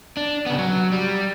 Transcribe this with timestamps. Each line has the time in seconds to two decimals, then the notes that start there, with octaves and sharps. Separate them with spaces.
0.17 D4
0.46 C#3 B3
0.59 F#3
0.92 G3